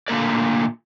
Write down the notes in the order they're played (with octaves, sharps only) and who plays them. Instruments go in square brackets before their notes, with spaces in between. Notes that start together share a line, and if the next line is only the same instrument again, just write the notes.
[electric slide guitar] A#2 D3 A3 A#3 B4 D5